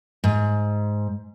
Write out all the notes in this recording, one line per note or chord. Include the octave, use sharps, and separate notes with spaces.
G#2